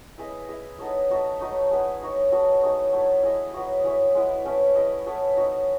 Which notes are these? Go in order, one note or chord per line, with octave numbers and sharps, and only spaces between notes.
E4 G#4 B4 D#5
E4 G#4 D#5
B3 D#4 A4 C#5
D#4 F#4 A4 E5
F#3 A3 D#4
B3 E4 G#4
D#4 F#4 C#5
F#3 B3 F#4 A4
A3 D#4 G#4 C#5
F#3 A3 E4 A4
E4 G#4 D#5
F#3 B3 F#4
E4 G#4 C#5 E5
G#3 B3 E4
A3 C#4 E4 B4
E4 G#4 D#5
B3 E4 A4 C#5
D#4 F#4 C#5 E5